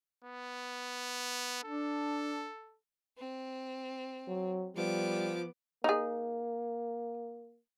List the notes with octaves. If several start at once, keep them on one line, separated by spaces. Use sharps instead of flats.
B3
D4 A4
C4
F#3
F3 G3 B3 D6
A#3 D#4 G#4